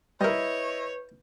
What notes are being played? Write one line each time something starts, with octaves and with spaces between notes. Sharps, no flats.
G3 E4 A#4 B4 C#5 D#5 G6